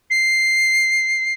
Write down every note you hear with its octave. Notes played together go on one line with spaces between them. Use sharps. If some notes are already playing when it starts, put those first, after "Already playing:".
C7